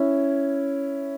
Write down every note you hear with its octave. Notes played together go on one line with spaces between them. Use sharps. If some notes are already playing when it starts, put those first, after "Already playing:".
Already playing: C#4 E4